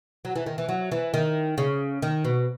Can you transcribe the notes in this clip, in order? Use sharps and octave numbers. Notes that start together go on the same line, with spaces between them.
F#3
E3
D#3
E3
F#3
E3
D#3
C#3
D#3
B2